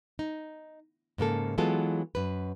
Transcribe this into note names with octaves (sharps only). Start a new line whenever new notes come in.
D#4
G#2 C#3 A#3 A4
E3 F#3 G#3 B3 F4 A4
F#2 B4